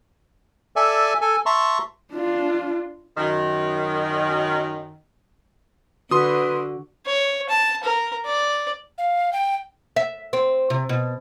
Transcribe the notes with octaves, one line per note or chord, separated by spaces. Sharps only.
A4 D5 E5 G#5
A4 G#5
E5 A5 A#5 C6 C#6
D4 F4
F#2 D#3
D3 F#4 B4 C6 D#6
C#5
A5
A#4
D5
F5
G5
E5
C4
C3
B2